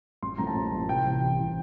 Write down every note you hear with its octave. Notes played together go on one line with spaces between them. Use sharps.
A1 C6
A2 F3 A#3 A#5
A5
A1
A2 F3 A#3
C2 G5
C3 E3
C2
C3 E3